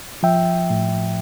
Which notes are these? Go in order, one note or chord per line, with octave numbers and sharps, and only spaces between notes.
F3 E5 G5
A2